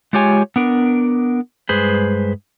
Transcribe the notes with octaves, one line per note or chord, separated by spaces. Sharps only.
G#3 F4 G4 C#5 G#5
B3 D4 A#4
G2 G#3 G#4 B4 C5